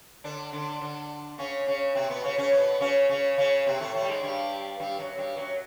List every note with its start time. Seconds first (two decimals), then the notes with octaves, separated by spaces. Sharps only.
0.24 D3 D4
0.53 D3 D4
0.81 D3 D4
1.38 C#3 C#4
1.67 C#3 C#4
1.95 C3 C4
2.09 B2 B3
2.23 C#3 C#4
2.38 C#3 C#4
2.52 B2 B3
2.80 C#3 C#4
3.09 C#3 C#4
3.38 C#3 C#4
3.67 C3 C4
3.80 A2 A3
3.95 A2 A3
4.02 G3
4.09 G#2 G#3
4.23 G2 G3
4.80 G2 G3
4.99 F#2 F#3
5.18 G2 G3
5.37 F#2 F#3